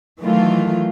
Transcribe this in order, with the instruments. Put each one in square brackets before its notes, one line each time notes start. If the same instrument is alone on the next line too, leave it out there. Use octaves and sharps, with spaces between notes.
[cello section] D#3 E3 F#3 A3 F4